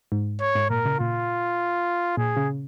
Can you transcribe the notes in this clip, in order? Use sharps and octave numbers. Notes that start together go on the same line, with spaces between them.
G#2
C#5
G#2
A#2 A#4
C#3
A#2 F4
A#2 G#4
C#3